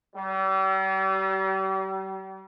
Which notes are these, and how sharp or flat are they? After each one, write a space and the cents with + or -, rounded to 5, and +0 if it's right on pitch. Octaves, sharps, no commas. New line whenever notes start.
G3 -40